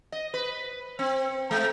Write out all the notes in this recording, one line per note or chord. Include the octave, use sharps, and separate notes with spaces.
D#5
B4
C4
G#3